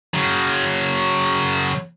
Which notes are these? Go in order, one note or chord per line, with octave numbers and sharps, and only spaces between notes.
C#3 F#3